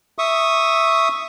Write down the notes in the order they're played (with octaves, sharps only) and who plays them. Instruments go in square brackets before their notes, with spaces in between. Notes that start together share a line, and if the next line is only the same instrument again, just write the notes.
[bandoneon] E5 C#6 D#6